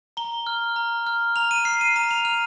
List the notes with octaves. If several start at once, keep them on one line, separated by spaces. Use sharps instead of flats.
A#5 G7
F6
A#5
F6
A#5 F7
D#7
F6 C7
D#7
A#5 D#7
F7
F6 F7